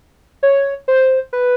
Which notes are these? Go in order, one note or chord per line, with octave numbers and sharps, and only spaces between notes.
C#5
C5
B4